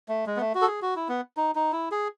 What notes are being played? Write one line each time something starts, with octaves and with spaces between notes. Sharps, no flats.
A3
G#3
B3
A3
F#4
A4
G#4
F#4
E4
B3
D#4
D#4
E4
G#4